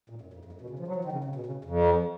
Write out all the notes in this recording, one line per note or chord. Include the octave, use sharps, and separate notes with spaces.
A#2
F#2
F2
F2
F#2
B2
C#3
F3
F#3
F3
D#3
C#3
C#3
B2
C#3
F2